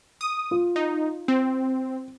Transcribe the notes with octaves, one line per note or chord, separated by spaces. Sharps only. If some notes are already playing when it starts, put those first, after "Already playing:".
D#6
F4
D#4
C4